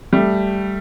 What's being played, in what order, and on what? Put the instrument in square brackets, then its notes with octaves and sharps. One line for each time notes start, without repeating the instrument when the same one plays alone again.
[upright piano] G3 A3